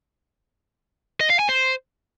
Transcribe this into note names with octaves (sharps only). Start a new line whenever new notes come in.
D#5
F5
G#5
C5